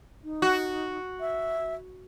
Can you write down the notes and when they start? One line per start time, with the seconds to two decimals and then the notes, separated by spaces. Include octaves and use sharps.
0.24 D#4
0.42 F#4
1.20 E5